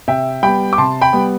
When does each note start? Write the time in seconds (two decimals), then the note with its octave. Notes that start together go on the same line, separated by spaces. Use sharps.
0.08 C3 E5 G5
0.43 G3 B3 G5 B5
0.73 D6
0.78 C3 A5 C6
1.01 G5 B5
1.13 G3 B3